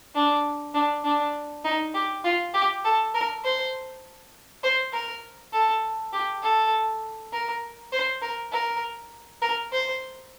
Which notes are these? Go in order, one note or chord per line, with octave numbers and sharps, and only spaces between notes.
D4
D4
D4
D#4
G4
F4
G4
A4
A#4
C5
C5
A#4
A4
G4
A4
A#4
C5
A#4
A#4
A#4
C5